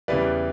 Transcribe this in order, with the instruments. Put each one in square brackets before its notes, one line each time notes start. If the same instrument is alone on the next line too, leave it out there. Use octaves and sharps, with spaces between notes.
[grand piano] E2 C#3 E3 G3 B4 D5